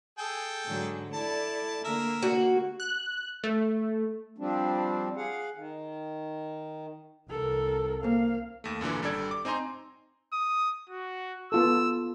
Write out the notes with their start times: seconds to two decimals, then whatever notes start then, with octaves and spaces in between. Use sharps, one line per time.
0.18 G#4 A4 G5
0.67 G#2 D3 F#3
1.13 E4 A4 D5 A5
1.85 D3 A#3 A#4 E5
2.23 A#3 F#4
2.80 F#6
3.44 A3
4.38 F3 G3 C4 D4
5.17 G#4 F5 F#5
5.56 D#3
7.30 C2 A4 A#4
8.03 A#3 C4 F5
8.64 D#2 A3
8.81 F#2 A#2 D3 E3
9.02 G#1 G3 D4 A4 D5 G#6
9.31 D6
9.45 C4 D#4 G#5 A#5 C6
10.33 D#6
10.89 F#4
11.52 B3 F4 A4 E6